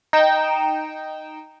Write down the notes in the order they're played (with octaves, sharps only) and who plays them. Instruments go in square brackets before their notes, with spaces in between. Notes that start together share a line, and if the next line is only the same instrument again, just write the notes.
[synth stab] D#4 G5 E7